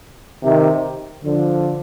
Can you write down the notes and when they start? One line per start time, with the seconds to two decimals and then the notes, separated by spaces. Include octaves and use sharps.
0.43 C3 D#3
1.25 D3 F3